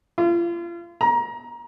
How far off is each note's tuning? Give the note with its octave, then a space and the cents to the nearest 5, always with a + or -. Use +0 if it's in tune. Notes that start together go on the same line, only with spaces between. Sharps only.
F4 -35
A#5 +25